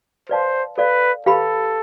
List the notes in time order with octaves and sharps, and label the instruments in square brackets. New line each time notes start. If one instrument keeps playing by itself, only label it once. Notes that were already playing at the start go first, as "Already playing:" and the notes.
[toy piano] B4 D5 F5 A5 C6 [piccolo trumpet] C5
[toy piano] A4 D5 F5 [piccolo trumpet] B4
[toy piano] G4 B4 F5 B5 [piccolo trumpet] A4